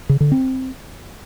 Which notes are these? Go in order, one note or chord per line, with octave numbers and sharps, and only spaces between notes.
C#3
D3
C4